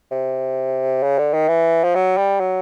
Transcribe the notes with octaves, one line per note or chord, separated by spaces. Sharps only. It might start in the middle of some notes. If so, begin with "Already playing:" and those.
C3
C#3
D3
D#3
E3
F3
F#3
G3
F#3